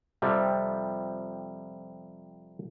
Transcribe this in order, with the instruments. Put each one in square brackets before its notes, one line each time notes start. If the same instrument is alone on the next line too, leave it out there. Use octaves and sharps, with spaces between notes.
[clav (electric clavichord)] F2 C3 F3 G3